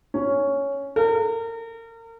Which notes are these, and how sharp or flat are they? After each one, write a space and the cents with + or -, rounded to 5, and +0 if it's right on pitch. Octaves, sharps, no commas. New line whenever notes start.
C#4 +5
A#4 -35